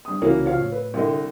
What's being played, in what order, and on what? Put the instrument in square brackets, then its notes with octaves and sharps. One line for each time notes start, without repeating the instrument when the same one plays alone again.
[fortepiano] G2 D#6
[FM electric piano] C2 C#3 F#4 [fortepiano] E3 A#3 C#4
[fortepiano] F3 C#5 F5
[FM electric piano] A2
[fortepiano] B4
C2 D3 D#5